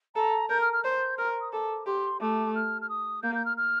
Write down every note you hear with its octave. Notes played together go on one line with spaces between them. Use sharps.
A4 A#5
A#4 G6
F6
F6
C5 G6
A#4 F6
D#6
A4 D6
G4 C6
A3 D6
F6
F6
D#6
A#3 G6
G6
F6
F6